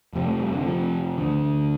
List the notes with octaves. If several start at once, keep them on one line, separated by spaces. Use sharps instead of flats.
F1 F2 C3
A3
G3
D3
F3
D2 D3